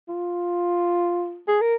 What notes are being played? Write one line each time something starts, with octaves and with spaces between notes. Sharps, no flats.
F4
G#4
A#4